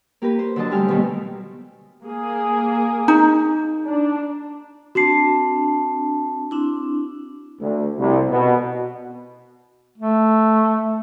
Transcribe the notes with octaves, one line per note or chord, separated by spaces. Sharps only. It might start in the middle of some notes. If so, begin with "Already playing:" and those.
A#3 G4 A#4 B4
C5
D3 F#3 D4 D#5 A5
G3 A3 G4 G#5 F6
B2 D3 D#3 G3 A3 A#3
A#3 G#4
D#4
D4
C4 D4 F#4 A5 C7
C4 D4 E4
D2
C2
B2
A3